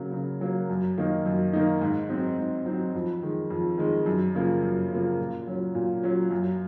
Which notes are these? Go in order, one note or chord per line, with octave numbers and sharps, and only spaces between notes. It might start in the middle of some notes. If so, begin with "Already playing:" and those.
Already playing: C#3 F#3 A#3
C#3
F#3 A#3
F#2
D#3 A#3 D#4
F#2
D#3 A#3 D#4
G#2
F#3 C4 D#4
G#2
F#3 C4 D#4
F2
D#3 G#3
F2
D#3 G#3
F#2
C#3 F3 A#3
F#2
C#3 F3 A#3
A#2
F#3 C#4
A#2
F#3 C#4
F#2